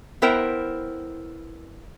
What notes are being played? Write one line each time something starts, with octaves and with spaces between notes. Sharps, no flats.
B3 E4 A#4 C5 G5